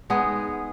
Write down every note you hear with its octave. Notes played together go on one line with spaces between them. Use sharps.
G#3 B3 D#4 G#4